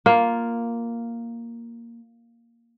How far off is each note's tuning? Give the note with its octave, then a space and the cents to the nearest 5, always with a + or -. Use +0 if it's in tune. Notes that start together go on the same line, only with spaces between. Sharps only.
A#3 +0 F4 +0